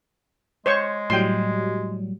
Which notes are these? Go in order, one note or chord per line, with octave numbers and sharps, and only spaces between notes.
G#3 C5 C#5 C#6
A2 F#3 G3 G5 C6